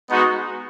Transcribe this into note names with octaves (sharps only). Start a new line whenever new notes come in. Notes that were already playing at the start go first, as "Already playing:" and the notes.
G#3 B3 D#4 F#4